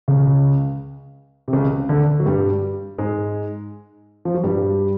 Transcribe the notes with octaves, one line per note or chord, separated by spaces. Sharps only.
C#2 C#3
C3
C#2 C#3
D2 D3
F#3
G2 G3
G#2 G#3
F3
F#3
G2 G3